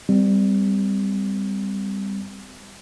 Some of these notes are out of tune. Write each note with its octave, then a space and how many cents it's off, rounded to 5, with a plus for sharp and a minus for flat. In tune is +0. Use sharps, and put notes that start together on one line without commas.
G3 +15 C4 -30